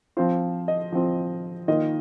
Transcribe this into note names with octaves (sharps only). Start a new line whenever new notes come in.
F3 C4 F4 C5
D#5
F3 C4 F4
D#3 A#3 F4 D#5